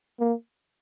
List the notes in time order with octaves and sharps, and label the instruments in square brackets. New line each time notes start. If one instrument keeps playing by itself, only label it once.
[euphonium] A#3